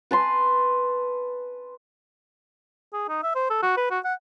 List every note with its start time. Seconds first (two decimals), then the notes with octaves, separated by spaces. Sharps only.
0.11 B4 A5 C6
2.93 G#4
3.09 D#4
3.23 E5
3.35 C5
3.50 A4
3.63 F#4
3.77 B4
3.91 F#4
4.04 F#5